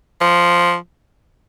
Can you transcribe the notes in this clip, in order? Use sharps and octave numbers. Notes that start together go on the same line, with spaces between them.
F3